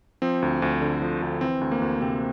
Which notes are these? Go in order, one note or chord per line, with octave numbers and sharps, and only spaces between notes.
F3 C4
D2
D2
D3
F3
D2
E3 C4
D2
A#3
D2
C3 C4